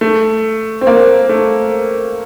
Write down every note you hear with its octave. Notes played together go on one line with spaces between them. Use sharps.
A3
C4
A#3
A3